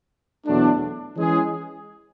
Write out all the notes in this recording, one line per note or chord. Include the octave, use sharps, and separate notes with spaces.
E2 B2 F#3 A3 D4
E3 G#3 C#4 G#4